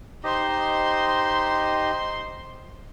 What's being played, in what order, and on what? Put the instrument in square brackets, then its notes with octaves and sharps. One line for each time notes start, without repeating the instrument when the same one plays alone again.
[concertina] D#4 G4 D#5 [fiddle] C5 C6